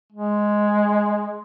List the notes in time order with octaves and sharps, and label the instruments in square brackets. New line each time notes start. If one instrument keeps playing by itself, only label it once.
[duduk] G#3